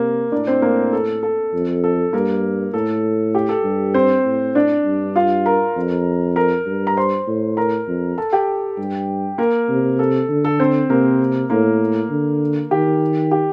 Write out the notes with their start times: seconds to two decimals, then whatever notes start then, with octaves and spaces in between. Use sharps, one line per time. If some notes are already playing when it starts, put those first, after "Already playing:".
Already playing: C3 A#3 A#4
0.32 A2 D4 D5
0.47 C4 C5
0.62 A#3 A#4
0.93 A4
1.23 A4
1.53 F2
1.84 A4
2.13 G2 A#3 A#4
2.74 A2 A4
3.35 G4
3.49 A4
3.64 G2
3.94 C4 C5
4.25 A2
4.55 D4 D5
4.85 G2
5.16 F4 F5
5.46 A#4 A#5
5.76 F2
6.36 A#4 A#5
6.66 G2
6.87 A#5
6.97 C5 C6
7.27 A2
7.57 A#4 A#5
7.87 F2
8.18 A4 A5
8.33 G4 G5
8.78 G2
9.38 A#3 A#4
9.69 C3
9.99 A4
10.30 D3
10.45 A4
10.60 C4 C5
10.90 C3 A#3 A#4
11.50 A2 A#3 A#4
12.10 D3
12.71 D#3 G4
13.31 G4